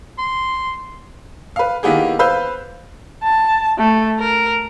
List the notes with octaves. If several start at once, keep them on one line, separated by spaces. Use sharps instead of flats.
C6
B4 F5
D#3 A#3 B3 E4 G4 G#4
B4 C5 F5 E6 G6
A5
A3
A#4